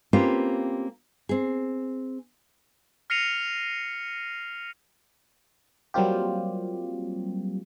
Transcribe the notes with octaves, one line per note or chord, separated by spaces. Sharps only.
A#3 C4 C#4 F4 G4 B4
C4 G#4
F6 A#6 C7 C#7 D#7 F7
F#3 G3 A#3 C4 F4 G4